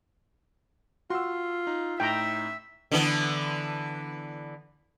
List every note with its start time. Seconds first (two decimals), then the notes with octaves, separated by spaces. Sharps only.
1.10 F4 F#4 C6 E6
1.67 D#4
2.00 A2 D#4 E5 G5 A#5
2.91 D3 E3 B3